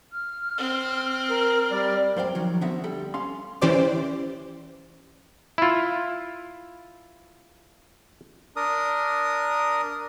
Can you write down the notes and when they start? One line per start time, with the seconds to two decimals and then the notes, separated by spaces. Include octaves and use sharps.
0.12 F6
0.58 C4
1.30 A#4
1.72 G3 D5
2.16 F#2 C5 F5 G5
2.35 D#3 F3 F#3
2.61 D3 B3 C4 E5 F#5
2.84 G3 A4
3.14 C#4 F5 C6
3.61 E3 C#4 G4 C5 D5 D6
5.58 E4 F4
8.56 D4 A#4 D#6